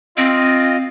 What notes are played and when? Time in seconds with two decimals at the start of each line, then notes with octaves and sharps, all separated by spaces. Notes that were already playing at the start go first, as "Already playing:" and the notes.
0.17 C4 F4 D#5